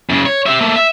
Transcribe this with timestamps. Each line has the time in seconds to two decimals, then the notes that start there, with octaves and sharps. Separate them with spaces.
0.10 F#2 C#3
0.26 C#5
0.46 G4 E5
0.61 A3 A#3
0.76 E5